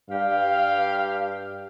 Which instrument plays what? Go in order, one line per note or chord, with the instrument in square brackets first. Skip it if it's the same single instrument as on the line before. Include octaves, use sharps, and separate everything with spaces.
[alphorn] G2 [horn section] G4 F5